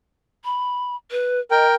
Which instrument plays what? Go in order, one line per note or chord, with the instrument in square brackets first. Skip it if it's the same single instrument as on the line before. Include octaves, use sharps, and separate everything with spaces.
[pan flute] B5
B4
[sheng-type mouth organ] A#4 G5 [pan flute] D#5